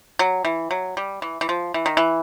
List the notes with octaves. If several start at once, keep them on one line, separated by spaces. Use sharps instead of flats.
F#3
E3
F#3
G3
E3
E3
F3
E3
D#3
E3